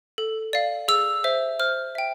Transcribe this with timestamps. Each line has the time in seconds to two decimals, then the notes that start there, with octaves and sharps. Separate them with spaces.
0.18 A4
0.53 D5 F5
0.88 G#4 E6
1.24 C5 E5
1.60 C5 F6
1.95 E5 G5